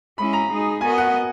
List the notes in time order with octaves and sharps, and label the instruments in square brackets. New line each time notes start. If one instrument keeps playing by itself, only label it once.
[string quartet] G#3 C#4 E4 [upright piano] B5
[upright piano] A#5
[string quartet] G#3 D#4 G#4
[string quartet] B3 F#4 A#4 D#5 [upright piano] G#5
[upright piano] F#5